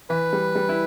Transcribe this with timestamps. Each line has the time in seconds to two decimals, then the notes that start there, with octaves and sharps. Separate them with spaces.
0.10 E3 B4
0.33 G3
0.55 G3
0.69 E4